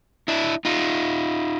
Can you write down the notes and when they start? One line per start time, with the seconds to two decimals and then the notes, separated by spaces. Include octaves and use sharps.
0.28 D4 E4
0.65 D#4 F4